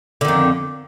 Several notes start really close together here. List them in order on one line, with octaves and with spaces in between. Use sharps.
D3 D#3 F2